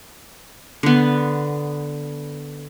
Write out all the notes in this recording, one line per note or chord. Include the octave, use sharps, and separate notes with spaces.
D3 B3